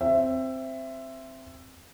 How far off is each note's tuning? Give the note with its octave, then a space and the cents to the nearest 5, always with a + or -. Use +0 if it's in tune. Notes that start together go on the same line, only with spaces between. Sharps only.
C4 +0 E5 +15